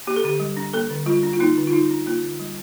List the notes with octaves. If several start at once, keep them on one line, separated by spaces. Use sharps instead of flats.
A#3 G4
A4
D3 G4
G3
D4
A#3 A4
D3
G3 F4
D4
F4
A#3 D#4
D3
F4
G3 D#4
D4
A#3 F4
D3
G3